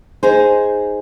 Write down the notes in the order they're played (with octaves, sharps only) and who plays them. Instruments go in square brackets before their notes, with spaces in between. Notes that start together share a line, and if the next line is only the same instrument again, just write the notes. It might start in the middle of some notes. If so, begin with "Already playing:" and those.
[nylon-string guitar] D#4 G#4 C5